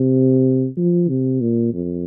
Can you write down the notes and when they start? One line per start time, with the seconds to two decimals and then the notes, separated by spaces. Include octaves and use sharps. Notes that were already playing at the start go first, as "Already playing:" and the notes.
Already playing: C3
0.77 F3
1.09 C3
1.41 A#2
1.74 F2